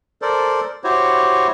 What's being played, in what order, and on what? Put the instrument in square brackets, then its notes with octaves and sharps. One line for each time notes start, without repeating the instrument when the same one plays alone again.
[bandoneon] A4 A#4 C5 D5
E4 F#4 G4 C5 C#5